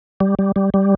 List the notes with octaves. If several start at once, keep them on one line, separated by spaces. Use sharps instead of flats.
G3
G3
G3
G3